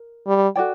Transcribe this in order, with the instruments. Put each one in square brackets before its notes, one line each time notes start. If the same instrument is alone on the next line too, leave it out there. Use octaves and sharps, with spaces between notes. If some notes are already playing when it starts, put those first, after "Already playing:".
Already playing: [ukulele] A#4
[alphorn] G3
[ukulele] F#4 A4 D5 G5